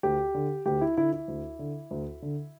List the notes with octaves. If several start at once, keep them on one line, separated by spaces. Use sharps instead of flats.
D2 G4
D3
D2 G4
E4
D3 E4
E4
D2
D3
D2
D3